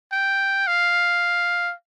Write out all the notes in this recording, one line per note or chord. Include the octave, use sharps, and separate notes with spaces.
G5
F5